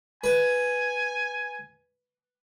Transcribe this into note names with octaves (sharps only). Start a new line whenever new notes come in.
B4 G#5